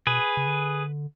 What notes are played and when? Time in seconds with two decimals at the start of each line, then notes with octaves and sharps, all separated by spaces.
0.07 B2 G#4 B4
0.37 C#3
0.47 D3